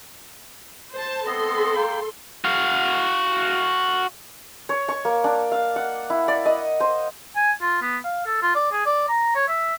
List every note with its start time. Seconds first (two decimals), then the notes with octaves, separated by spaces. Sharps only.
0.94 C5 A5
1.26 B3 C4 A4 D#5 C6
1.76 A#3 G5
2.45 F#4 F5
4.69 C#5
4.88 C#6
5.05 A#3
5.24 D4
5.52 F5
5.76 F#5
6.10 E4
6.28 D5
6.45 D#5
6.80 C5
7.36 G#5
7.62 F4
7.82 B3
8.04 F5
8.26 A4
8.42 F4
8.55 D5
8.72 G#4
8.86 D5
9.09 A#5
9.35 C#5
9.48 E5